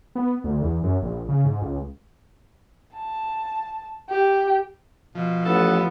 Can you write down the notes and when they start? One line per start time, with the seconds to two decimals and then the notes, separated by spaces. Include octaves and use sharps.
0.15 B3
0.44 D2
0.62 E2
0.83 F#2
1.02 A#1
1.29 C#3
1.45 G#2
1.62 C#2
2.95 A5
4.09 G4
5.15 B2 F3
5.45 A1 B3 A4